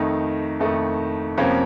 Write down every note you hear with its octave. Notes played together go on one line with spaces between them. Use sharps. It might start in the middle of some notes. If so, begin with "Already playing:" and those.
Already playing: F2 D#3 A3 D#4
F2 D#3 A3 D#4
F2 C3 F3 A#3 C#4